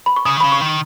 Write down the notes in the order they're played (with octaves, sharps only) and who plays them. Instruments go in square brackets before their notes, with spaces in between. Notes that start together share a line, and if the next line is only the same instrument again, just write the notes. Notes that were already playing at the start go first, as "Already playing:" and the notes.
[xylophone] B5
C#6
[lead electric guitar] C#3 [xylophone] D#6
[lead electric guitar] D#3
[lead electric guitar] C#3 [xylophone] B5
[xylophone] C#6
[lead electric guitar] D#3